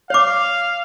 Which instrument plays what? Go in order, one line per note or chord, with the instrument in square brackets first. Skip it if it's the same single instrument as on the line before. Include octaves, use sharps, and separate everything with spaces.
[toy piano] C#5 D6 [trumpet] F5